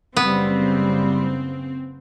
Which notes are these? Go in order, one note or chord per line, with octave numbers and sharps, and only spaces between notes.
F#1 C#3 G3 B3 C4